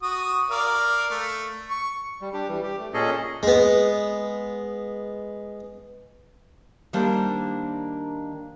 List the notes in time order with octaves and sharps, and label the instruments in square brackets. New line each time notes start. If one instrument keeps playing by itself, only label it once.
[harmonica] F#4 D#6
A#4 D5 F5
A3
C#6
[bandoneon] G3
D4 G4
E3 G3
G4
A3
A#2 C#4 G#4 A4 D#5
[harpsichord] G#3 B3
[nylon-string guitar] D#3 G3 A#3 D4 C5